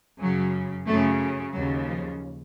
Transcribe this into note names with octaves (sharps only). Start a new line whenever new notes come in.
F#2 C#3 F#3
F#2 C#3 A3
D#2 C#3 F#3
F3